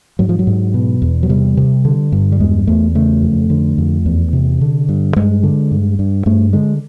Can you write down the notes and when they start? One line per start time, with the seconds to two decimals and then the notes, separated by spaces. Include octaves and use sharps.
0.19 G#2 F#3
0.29 F3
0.39 F#3
0.47 G#2
0.74 B2
1.02 E2
1.23 F#3
1.29 C3 G3
1.57 C3
1.85 D3
2.12 G2
2.32 G3
2.40 E2 G#3
2.67 E2 A3
2.95 C#3 A3
3.22 F2
3.50 D3
3.78 F2
4.06 E2
4.33 C3
4.61 D3
4.89 G2
5.16 G2 G#3
5.43 D3
5.71 G2
5.99 G2
6.26 G2 A3
6.53 D3 G#3